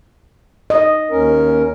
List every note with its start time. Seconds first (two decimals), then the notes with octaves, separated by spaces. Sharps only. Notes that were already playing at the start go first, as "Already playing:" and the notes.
0.70 D#5
1.11 D#2 C#4 A#4